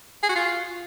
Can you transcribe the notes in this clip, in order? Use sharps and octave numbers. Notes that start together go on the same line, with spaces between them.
G#4
F#4
F4